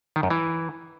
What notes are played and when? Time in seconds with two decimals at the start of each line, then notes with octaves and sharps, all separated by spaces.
0.16 D#3
0.23 F#2
0.30 E3